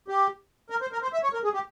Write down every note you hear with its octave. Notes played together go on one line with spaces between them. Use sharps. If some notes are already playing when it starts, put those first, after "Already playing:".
G4
A#4
C5
A#4
C5
E5
C#5
A#4
G#4
G4